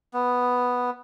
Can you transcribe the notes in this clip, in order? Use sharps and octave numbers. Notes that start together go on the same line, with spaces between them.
B3